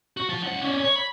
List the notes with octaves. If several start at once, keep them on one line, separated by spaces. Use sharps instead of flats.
F#4
F3 A5
C#2 F#5
C#4 D4
C#5
B5